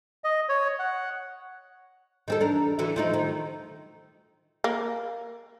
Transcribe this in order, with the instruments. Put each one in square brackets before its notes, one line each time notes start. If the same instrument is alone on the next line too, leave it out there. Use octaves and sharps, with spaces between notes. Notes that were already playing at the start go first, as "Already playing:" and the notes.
[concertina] D#5
C#5
F#5
[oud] D#3 C4 A4
E2 D4 A#4
D3 E3 F#4
F3 A3 D#4
D#3
[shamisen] A#3